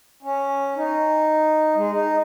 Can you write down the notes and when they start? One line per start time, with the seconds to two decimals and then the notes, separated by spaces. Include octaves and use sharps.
0.23 C#4
0.76 D#4
1.75 G#3
1.92 D#4